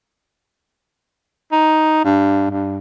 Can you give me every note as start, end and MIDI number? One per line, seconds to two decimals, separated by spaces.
1.52 2.04 63
2.05 2.49 43
2.51 2.78 43